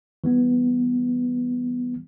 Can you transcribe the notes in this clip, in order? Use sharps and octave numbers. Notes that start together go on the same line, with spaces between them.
E3 G3 B3